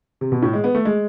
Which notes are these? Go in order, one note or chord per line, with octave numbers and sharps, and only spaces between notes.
C3
B2
A2
G#3
B3
A3
G#3